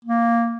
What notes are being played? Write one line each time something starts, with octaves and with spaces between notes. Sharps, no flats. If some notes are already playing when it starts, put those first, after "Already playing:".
A#3